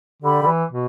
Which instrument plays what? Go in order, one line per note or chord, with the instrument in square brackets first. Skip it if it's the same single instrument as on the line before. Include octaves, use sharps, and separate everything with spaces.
[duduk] D3 [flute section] G4 D5 B5
[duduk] D3
E3
B2